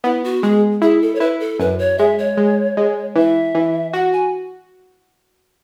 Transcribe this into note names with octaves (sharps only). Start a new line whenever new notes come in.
B3 E4
F#4
G#3 G#4
E4 G#4
A4
C#5
E4 B4
A4
F#2 B4
C#5
G#3 E5
C#5
G#3
G#3
E3 E5
E3
F#4 F#5
G#5